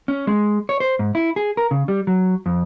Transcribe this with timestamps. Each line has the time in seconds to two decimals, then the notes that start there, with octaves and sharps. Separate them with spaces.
0.08 C#4
0.27 G#3
0.69 C#5
0.80 C5
0.99 G#2
1.15 E4
1.36 G#4
1.57 A#4
1.71 C#3
1.88 G3
2.07 F#3
2.46 F2